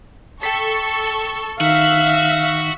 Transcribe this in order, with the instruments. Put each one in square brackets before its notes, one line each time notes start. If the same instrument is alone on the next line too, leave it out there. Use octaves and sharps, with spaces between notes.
[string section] A4 C#6 [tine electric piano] G5 B6
[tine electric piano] D#3 D#4 [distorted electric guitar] F#4 [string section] E5 [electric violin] F5